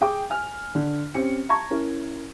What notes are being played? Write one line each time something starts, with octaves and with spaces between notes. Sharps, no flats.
G#4 G5 D6
G#5 F6
D3
C4 C#4 G4 C#7
A5 A#5 C#6 G#6
C#4 E4 A#4